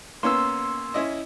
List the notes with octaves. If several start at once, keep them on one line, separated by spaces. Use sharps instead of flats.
A#3 B3 C#4 C6 E6
C#4 E4 D#5